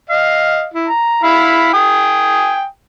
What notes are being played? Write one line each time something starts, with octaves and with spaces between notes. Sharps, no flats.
D#5 F5
E4
A#5
E4 F5 B5
G5 G#5 D#6